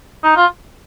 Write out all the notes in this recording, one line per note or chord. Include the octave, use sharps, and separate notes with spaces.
D#4
F4